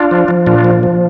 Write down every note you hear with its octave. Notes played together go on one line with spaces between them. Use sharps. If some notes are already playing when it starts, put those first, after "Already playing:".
Already playing: D4 F4
F3
F3
A#2 D4 F4
F3
F3